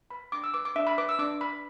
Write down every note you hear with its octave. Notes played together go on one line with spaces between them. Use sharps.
B4 B5
D4 D6
E6
B4 D6
D6
D4 E5
B5
B4 D6
E6
D4 D6
B4 B5